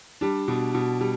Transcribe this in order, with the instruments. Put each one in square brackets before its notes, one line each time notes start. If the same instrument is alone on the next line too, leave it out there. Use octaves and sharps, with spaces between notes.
[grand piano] G3 D4
B2
B2
G3